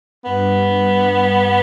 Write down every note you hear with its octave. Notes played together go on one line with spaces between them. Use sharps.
G2 B3